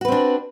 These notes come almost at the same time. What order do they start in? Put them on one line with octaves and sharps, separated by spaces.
F#4 B4 C4 D4